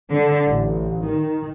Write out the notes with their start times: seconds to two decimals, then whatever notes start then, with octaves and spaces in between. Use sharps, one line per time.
0.11 D3
0.48 A1
1.09 D#3